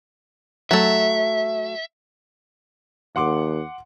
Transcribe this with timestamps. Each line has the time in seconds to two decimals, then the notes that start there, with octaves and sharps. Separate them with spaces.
0.71 F#3 A3 E5
3.16 D#2 F#5 C6 D6